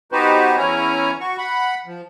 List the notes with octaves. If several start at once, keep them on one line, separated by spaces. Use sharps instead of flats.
B3 D#4 F#4 G4 B4 C5
E2 C#4 E4 C#5 G#5 A#5
F#4 C#6
F#5 B5
F3